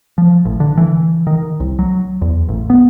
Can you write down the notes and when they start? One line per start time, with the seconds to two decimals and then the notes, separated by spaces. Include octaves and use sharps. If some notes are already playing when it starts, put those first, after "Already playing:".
0.18 F3
0.45 A1
0.60 D3
0.78 E3
1.27 D#3
1.60 C2
1.79 F#3
2.22 E2
2.49 A1
2.70 B3